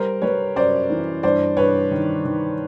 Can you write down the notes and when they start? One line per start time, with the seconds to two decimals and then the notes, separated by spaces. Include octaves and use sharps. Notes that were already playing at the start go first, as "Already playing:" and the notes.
Already playing: G3 A#4 C5
0.22 G3 B4 C#5
0.55 F#2 C5 D5
0.90 E3
1.23 G2 C5 D5
1.57 G2 B4 C#5
1.91 D#3
2.25 D#3